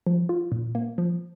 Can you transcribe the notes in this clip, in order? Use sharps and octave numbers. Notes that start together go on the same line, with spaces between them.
F3
F4
A#2
A#3
F3